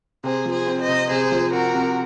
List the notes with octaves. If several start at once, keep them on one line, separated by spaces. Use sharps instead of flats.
C3 G#4 C5
F3
G#4 C5
C4
C5 D#5
C3
C3 G#4 C5
F3
C4 F#4 A#4
C3